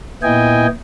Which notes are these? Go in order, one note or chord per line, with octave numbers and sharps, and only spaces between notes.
A#2 B3 E4 D#5 G5 G#5